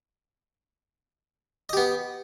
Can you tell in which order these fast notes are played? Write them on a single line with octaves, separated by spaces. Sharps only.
D#5 G4 B3